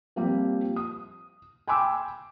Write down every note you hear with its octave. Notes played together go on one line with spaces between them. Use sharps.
F3 G3 A#3 C4 G4
D#6
G5 G#5 B5 C6 D6 E6